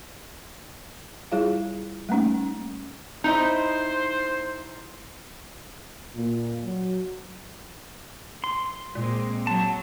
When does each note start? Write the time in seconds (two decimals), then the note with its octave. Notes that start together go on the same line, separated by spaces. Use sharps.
1.32 G3 E4 F4 G#4 C#5 F5
2.09 G3 A3 A#3 C#4 D#4
3.24 D#4 E4 C5 D#5
6.15 A#2
6.64 F#3
8.44 C6
8.95 A#2 G#3 A#3 C4
9.47 F#3 A5